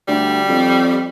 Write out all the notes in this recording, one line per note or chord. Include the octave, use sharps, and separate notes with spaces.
D2 G3
F2